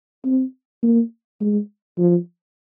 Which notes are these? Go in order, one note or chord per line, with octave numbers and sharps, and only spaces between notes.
C4
A#3
G#3
F3